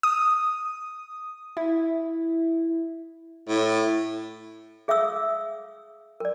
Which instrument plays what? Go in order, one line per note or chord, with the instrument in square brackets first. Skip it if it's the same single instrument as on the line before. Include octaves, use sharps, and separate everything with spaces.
[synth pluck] D#6
E4
[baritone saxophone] A2
[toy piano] G#4 E5 F5 D#6 E6
A#4 D5